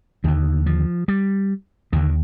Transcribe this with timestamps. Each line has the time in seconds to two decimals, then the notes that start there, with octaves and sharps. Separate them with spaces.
0.24 D#2 D3 D#3
0.66 F3
1.08 G3
1.93 D#2 D3 D#3